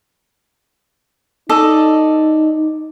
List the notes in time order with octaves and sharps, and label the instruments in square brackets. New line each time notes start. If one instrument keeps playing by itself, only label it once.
[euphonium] D#4 [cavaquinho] A4 D5 D#5